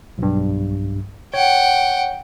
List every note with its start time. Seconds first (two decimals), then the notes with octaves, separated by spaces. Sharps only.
0.18 B1 G2
1.34 C#5 F#5 G5